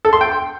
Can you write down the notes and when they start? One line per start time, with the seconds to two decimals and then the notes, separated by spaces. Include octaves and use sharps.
0.05 A4
0.13 C6
0.21 G5